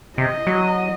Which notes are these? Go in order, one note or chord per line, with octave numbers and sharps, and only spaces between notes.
C3 D#5
F#3